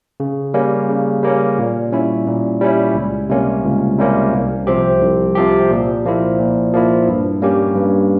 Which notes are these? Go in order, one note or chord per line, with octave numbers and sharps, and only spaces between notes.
C#3
G3 A#3 C#4
C#3
G3 A#3 C#4
A#2
G3 C#4 E4
A#2
G3 C#4 E4
C#2
C3 G3 A#3 C#4
C#2
C3 G3 A#3 C#4
C2
C3 F3 C4 G4
C2
C3 F3 C4 G4
A#2
F3 A#3 E4
A#2
F3 A#3 E4
G2
G3 A#3 C#4 G4
G2